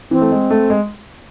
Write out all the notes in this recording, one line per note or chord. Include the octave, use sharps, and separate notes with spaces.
E3 C4
A3
G#3
A3
G#3